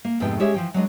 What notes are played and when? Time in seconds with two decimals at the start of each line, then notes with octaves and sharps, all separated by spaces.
0.05 A#3
0.20 F2 G#2 C3 A3 B3 G5
0.40 G#3 C#4 G4 C#5 E5
0.54 E3 F3 G5
0.74 F#3 G#3 D4 D#5